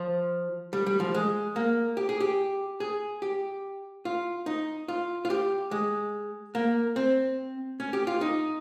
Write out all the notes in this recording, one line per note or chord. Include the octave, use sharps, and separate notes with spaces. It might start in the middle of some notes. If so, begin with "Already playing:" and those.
Already playing: F3
G3
G3
F3
G#3
A#3
G4
G#4
G4
G#4
G4
F4
D#4
F4
F4
G4
G#3
A#3
C4
C#4
G4
F4
D#4